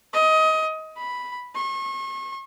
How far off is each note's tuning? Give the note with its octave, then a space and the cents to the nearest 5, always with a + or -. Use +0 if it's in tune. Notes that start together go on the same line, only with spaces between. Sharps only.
D#5 +20
B5 +0
C#6 -40